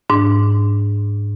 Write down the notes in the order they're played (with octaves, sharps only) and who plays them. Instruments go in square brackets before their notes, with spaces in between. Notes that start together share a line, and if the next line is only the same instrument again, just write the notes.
[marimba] G#2 D4